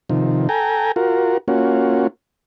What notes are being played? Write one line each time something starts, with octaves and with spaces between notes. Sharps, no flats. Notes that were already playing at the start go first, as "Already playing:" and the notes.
C3 D#3 F3
A4 G5 G#5 A#5
F4 F#4 A#4
A#3 C#4 F4 F#4